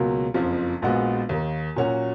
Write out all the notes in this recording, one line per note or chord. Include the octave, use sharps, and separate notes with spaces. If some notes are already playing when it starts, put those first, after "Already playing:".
Already playing: C#2 B2 F#3 A#3
F#1 F2 F3
A#1 A#2 G#3 B3 F#4
D#2 D#3 A#3
A#2 F#3 C#4 F#4